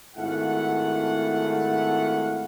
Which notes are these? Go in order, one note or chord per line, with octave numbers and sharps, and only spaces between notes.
G#1 A3 E4 F5 F#5